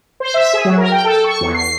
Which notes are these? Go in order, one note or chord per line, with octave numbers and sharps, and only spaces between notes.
C5
E5
G#4
F#3
A#4
G5
A4
C#6
E2
C7